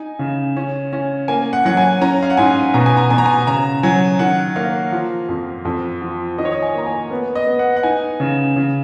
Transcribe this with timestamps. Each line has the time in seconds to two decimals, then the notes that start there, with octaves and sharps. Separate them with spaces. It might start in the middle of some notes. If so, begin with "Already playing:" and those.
Already playing: D#4 G#5
0.19 C#3
0.56 C#4
0.93 C#4
1.28 A#3 G#5
1.53 F#5
1.65 F#3 F#5
1.77 G#5
2.01 C#4 A#5
2.23 F5
2.30 F#5
2.37 G#2 G#5
2.74 B2 A#5
2.86 G#5
2.97 A#5
3.10 B2 G#5
3.18 A#5
3.26 G#5
3.47 C#3 A#5
3.83 F#3 G#5
4.19 D#3 F#5
4.56 A#3 F5
4.92 F3
5.29 F2
5.65 F2
6.02 F3
6.38 D#3 D#5
6.45 C#5
6.52 D#5
6.62 G#5
6.75 A#3 A#5
6.87 G#5
7.11 B3 A#4
7.35 D#5
7.47 B3
7.59 F#5
7.77 F#5
7.83 D#4 G#5
8.20 C#3
8.56 C#3